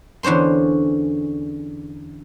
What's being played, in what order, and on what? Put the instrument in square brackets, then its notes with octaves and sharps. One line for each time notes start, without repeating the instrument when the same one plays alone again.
[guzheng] E2 D3 C#4 C5 C6